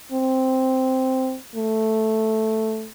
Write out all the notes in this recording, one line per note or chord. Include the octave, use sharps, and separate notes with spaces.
C4
A3